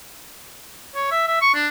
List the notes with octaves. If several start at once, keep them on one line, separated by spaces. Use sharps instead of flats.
C#5
E5
E5
C#6
D4